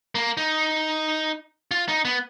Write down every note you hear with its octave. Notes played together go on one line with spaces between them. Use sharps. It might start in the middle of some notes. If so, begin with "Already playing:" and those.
A#3
D#4
F4
D#4
B3